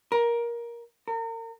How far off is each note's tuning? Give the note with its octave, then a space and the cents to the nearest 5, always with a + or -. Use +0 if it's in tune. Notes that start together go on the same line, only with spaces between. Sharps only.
A#4 +15
A#4 -35